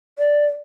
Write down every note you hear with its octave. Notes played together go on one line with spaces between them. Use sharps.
D5